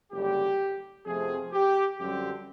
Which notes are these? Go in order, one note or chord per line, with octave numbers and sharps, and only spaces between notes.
F#1 F#2 D3 G3 G4
F2 C3 F3 A3 C4 G#4
G4
F#2 D3 G3 C4 G4